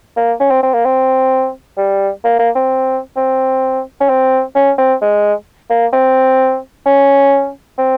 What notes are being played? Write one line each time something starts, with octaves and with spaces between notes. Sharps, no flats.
A#3
C#4
C4
C4
A#3
C4
G3
A#3
A#3
C4
C4
C#4
C4
C#4
C4
G#3
A#3
C4
C#4
C4